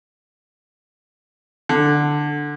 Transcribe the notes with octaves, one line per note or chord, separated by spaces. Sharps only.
D3